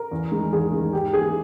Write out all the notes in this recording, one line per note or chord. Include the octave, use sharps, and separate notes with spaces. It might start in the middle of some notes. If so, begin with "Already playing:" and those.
Already playing: A#4
E2
D#3 G#3
E2 G#4
D#3 G#3
G#2 G4
E3 A#3 G#4